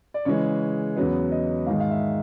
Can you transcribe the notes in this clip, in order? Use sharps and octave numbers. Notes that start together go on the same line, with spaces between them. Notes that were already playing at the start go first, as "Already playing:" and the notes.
D5
C#3 E3 G#3 C#5
E2 C#3 F#3 B3
D#5
G#2 D#3 G#3 F5
F5
E5